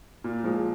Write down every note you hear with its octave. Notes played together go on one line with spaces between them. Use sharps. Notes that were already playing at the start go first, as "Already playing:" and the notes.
A#2
F3 G#3